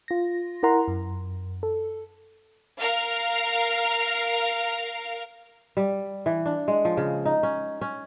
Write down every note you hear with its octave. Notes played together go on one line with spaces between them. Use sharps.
F4 A#6
E4 A#4 F#5 A#5 C6
F#2
A4
A#4 F5
G3
E3
D4
G#3
F3
C#3
D#4
C#4
C#4